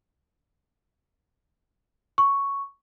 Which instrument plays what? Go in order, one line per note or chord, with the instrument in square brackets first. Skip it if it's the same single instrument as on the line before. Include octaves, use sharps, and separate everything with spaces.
[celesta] C#6